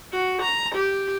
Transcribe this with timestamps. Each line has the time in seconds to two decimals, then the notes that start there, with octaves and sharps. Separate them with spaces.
0.12 F#4
0.42 A#5
0.75 G4